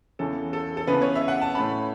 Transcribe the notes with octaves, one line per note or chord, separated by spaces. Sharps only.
E2 C#3 E3 C#4 A4
A4
A4
C#3 E3 B3 B4
C#5
E5
F#5
A5
A2 A3 C#4 B5